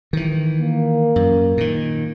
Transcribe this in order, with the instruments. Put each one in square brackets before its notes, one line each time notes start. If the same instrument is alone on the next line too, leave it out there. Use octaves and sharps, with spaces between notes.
[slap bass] D#3 E3
[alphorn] A#3
[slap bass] F#2
A#2 D#3